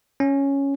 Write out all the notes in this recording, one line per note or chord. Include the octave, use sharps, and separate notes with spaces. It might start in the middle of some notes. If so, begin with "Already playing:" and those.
C#4